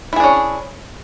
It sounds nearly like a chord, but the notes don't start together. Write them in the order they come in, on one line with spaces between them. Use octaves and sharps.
E4 G#4 D4 C#4